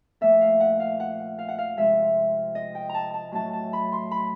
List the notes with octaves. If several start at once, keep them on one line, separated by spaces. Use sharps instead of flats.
A#2 F3 A3 E5
F5
F#5
F5
F#5
F5
F#5
F5
C3 F3 G#3 E5
D#5
G5
A#5
A5
A5
A2 F#3 A3 A5
A5
B5
C6
B5